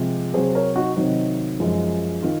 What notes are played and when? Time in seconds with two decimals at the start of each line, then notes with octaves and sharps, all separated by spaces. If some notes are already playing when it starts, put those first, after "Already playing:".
Already playing: C3 F3 G#3
0.34 C3 F#3 G#4 C5
0.55 A#4 C#5
0.76 D#4 F#4
0.96 C3 D#3 F#3 D#4
1.59 F#2 F3 G#3
2.22 D#3 F4